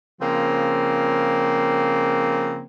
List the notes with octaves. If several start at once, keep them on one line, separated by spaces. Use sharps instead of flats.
C#3 F3 A#3 C4